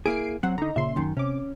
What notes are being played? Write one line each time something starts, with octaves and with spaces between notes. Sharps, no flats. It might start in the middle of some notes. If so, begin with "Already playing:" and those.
A#3 E4 G#4 C7 D7
F#3 C4 F#5
D3 D#4 A#5
A#2 C#3 E5 C6
F#2 D#3
C3 C#4 D6